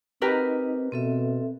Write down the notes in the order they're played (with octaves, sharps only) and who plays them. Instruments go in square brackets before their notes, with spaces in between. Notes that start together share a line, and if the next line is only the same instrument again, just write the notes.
[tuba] C4 [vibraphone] D#4 D#5 [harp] G4 A#4 B4
[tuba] B2 [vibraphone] C4 A4 E5